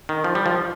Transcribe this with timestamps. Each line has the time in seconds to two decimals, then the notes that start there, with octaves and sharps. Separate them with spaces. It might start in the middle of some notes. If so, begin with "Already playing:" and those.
0.09 D#3
0.24 F3
0.35 G3
0.46 F3